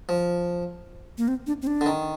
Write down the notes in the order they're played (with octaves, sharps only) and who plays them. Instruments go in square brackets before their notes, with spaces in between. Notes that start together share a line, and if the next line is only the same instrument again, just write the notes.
[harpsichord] F3
[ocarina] A#3
C4
D4
C4
D4
[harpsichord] D3
D#3